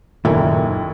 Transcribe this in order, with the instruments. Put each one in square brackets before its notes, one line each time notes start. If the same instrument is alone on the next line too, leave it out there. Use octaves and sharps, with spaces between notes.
[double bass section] F#1 [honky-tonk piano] D#2 [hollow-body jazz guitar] A#2 F#3 [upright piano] E4 A4 G#5